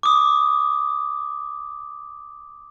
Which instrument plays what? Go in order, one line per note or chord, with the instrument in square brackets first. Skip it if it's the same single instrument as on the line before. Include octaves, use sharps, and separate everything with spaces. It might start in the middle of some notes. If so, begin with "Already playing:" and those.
[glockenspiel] D6 D#6